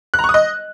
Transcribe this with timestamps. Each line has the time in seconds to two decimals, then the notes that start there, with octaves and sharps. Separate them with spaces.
0.14 F#6
0.19 A#5
0.24 C#6
0.29 D#6
0.34 D#5